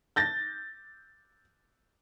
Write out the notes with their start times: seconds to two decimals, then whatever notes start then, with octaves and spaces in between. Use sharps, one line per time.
0.16 G6 A6 A#6